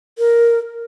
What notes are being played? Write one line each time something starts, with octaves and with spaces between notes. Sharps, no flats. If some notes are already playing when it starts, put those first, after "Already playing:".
A#4